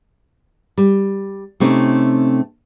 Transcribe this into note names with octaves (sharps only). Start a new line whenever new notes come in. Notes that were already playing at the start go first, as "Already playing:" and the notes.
G3
C3 A3 C4 C#4 D#4